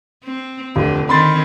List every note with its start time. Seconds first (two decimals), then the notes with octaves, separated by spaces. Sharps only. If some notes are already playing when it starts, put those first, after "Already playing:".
0.24 C4
0.76 F1 D3
1.09 D#3 C4 B5 C6 A6